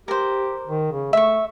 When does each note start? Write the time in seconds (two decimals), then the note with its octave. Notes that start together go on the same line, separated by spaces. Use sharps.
0.08 G4 A#4 C5
0.67 D#3
0.91 C#3
1.13 A3 E5 C#6